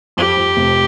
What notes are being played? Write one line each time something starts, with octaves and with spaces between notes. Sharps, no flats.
F2 G4
F2
F1